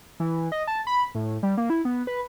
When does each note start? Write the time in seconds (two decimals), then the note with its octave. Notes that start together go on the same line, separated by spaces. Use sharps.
0.20 E3
0.52 D#5
0.67 A5
0.87 B5
1.15 A2
1.43 G3
1.57 A#3
1.70 E4
1.85 B3
2.07 B4